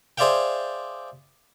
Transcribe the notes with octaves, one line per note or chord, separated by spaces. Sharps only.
G#4 C5 D5 E5 F5 G5